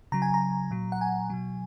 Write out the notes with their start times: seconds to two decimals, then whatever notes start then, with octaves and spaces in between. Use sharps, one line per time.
0.12 C#3 F#3 A#5
0.22 G#5
0.34 A#5
0.71 A#2 F#3
0.92 F#5
1.01 G#5
1.30 B2 F#3